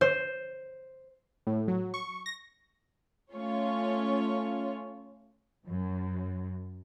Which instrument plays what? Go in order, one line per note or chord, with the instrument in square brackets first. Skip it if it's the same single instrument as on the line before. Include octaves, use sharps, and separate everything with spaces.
[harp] C5
[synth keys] A2
F#3
C#6
A#6
[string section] A3 C#4 F4 C#5
[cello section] F#2